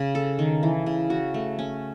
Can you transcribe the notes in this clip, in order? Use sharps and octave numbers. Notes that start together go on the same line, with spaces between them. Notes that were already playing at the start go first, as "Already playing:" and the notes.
Already playing: C#3 C#4
A4
D#3
E3
C#3
F#4
A3
C#4